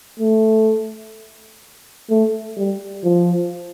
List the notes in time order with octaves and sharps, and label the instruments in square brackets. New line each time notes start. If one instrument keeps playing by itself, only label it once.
[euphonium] A3
A3
G3
F3